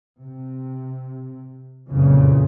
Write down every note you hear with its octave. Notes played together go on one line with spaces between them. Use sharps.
C3
F#1 C2 F2 A#2 C#3 E3